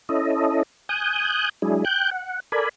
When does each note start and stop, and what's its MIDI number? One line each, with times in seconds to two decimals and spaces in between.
0.09 0.63 61
0.09 0.63 64
0.09 0.63 69
0.09 0.63 75
0.89 1.49 80
0.89 1.49 87
0.89 1.49 90
0.89 1.49 91
1.62 1.85 54
1.62 1.85 56
1.62 1.85 62
1.62 1.85 64
1.62 1.85 68
1.85 2.10 79
1.85 2.10 90
1.85 2.10 91
2.11 2.40 78
2.52 2.69 69
2.52 2.69 70
2.52 2.69 74
2.52 2.69 80
2.52 2.69 83